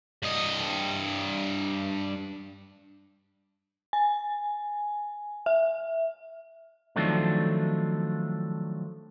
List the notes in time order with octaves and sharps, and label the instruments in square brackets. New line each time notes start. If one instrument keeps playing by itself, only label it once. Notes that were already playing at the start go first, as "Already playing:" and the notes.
[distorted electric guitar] G2 D#5
[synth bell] G#5
E5
[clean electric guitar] D#3 F3 F#3 A3 C4 D4